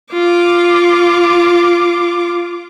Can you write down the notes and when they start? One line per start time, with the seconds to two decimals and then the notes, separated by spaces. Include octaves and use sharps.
0.12 F4 D6